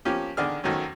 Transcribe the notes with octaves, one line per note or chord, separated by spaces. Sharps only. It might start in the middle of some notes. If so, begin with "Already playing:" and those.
F3 A#3 C#4 G4
A1 D3 D#3 D4 G#4 F6
G#1 D#3 F#3 A3 C#4